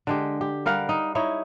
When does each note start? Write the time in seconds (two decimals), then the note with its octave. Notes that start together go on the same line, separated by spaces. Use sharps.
0.07 D3 G#3 G4
0.41 G4
0.66 G3 A#4 F5 F#5
0.89 D#4
1.15 D#4 E4 C#5